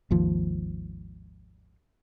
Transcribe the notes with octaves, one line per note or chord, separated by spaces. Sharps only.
G#1 D#2 F3